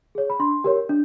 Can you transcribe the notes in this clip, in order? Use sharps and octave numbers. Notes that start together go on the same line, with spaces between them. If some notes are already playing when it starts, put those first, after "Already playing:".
G#4 C#5
B5
D4 C6
G4 A#4 C#5
D4